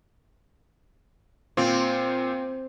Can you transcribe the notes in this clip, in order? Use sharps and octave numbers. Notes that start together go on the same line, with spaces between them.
A#2 C4 F4